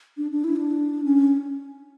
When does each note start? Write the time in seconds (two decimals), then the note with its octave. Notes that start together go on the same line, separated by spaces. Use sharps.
0.18 D4
0.32 D4
0.44 E4
0.56 D4
1.04 C#4